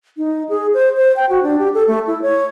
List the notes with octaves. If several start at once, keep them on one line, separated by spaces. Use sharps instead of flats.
D#4
G#4
C5
C5
G5
F#4
D4
G4
A4
A3
E4
C#5